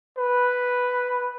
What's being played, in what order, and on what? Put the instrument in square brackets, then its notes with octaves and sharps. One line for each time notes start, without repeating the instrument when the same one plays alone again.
[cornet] B4